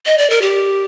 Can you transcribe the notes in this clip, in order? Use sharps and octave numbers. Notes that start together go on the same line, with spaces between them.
D#5
D5
A#4
G4